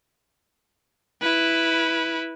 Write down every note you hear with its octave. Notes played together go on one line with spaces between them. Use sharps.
E4 B4